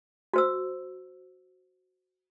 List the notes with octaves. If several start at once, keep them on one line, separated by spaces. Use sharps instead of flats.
F#4 C5 E6